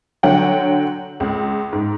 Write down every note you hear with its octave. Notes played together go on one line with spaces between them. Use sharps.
D3 F#3 F#5 G5
C#2
G#2